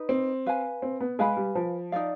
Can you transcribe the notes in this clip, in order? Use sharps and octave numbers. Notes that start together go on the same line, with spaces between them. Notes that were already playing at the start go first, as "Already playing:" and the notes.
Already playing: D#4 B4
C4
B4 F5 G#5
C4
B3
G#3 B4 F5 G#5 B5
G3
F3
D#4 B4 D5 F5